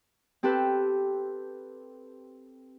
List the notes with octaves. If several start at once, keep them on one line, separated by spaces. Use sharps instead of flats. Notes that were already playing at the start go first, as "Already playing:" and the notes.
C4 G4 A4 B4